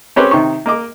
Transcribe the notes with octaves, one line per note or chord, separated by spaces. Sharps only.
C4 C#4 G4 B4 C#5
C3 D#3 D#4 C#6
A#3 D#5 D6